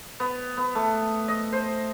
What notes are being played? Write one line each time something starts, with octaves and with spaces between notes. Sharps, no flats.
B3
B3
A3
D#5
C5